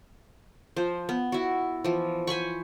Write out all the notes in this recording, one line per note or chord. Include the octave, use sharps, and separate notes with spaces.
F3 C5
B3
E4 F#4
E3 F3
C5 G#5 B5 C#6